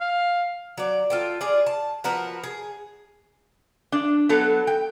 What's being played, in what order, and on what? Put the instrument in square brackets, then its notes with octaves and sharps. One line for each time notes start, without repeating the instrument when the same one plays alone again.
[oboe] F5
[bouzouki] F#3 D5
F4 A4 G5
F4 G#4 D5
A5
F3 F#4 A#4 B4
G#4
[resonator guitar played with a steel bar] D4
F#3 B3 A4
G5